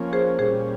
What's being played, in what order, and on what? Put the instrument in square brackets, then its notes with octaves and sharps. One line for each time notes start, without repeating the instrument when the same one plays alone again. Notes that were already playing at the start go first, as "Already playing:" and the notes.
Already playing: [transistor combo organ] F3 A#3 C#4
[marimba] G#4 C5
[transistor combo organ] A#2 G3 C#4 [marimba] G#4 C5